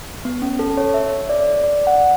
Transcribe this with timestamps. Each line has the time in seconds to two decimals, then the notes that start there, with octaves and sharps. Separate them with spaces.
0.25 B3
0.42 C#4
0.59 A4
0.77 C#5
0.94 E5
1.29 D5
1.64 D5
1.87 F#5